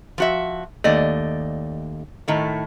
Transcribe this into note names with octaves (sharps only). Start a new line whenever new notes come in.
F3 F#4 E5
D#2 A3 D5 D#5
A2 D#3 A3